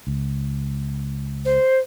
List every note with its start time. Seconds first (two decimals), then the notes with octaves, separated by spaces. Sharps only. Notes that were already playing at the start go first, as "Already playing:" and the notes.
0.07 C#2
1.45 C5